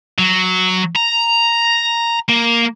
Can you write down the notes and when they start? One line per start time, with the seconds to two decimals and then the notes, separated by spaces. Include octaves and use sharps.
0.19 F#3
0.96 A#5
2.29 A#3